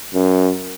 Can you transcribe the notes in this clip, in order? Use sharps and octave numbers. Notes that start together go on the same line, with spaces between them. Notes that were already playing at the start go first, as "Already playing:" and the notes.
F#2